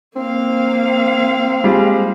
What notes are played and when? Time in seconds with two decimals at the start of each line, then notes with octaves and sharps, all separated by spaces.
0.16 A#3 C4 F5
1.64 G3 G#3 F4